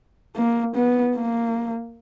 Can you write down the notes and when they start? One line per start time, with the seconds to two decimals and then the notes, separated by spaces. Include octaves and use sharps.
0.36 A#3
0.75 B3
1.15 A#3